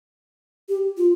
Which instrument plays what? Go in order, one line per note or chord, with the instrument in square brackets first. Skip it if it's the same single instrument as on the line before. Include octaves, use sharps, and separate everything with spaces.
[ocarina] G4
F4